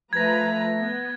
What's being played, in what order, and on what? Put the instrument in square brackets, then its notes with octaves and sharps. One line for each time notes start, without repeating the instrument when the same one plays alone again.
[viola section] F3 B4 A#5 [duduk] A3 [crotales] G#6 A#6
[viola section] B3